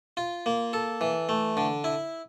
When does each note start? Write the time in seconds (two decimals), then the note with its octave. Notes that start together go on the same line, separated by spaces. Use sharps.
0.17 F4
0.46 A#3
0.73 A4
1.01 E3
1.29 A3
1.57 D3
1.84 E4